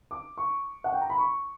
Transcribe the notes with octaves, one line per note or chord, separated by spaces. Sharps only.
D6
C#6
F#5
G5
A#5
B5
C#6